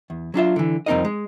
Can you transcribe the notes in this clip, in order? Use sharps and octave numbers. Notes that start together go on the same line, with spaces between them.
E2
F#3 D4 F4 E5
D3 E3
C2 F2 C4 D#4 A#4 D#5
G#3